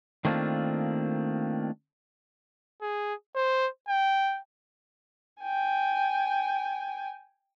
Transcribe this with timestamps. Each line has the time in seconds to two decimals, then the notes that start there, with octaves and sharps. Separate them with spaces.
0.25 D#3 A3 A#3 C4 D4 F4
2.82 G#4
3.35 C5
3.89 G5
5.42 G5 G#5